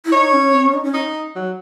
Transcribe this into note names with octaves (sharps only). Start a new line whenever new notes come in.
E4
D#4 C#5
C#4
C4
C#4
D#4
C#4
D#4
F#3